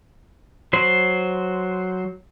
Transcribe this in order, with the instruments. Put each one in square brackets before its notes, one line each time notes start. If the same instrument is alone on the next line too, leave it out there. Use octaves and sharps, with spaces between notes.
[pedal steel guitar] F#3 C5